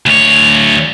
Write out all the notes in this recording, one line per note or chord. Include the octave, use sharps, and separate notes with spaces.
D2 C#5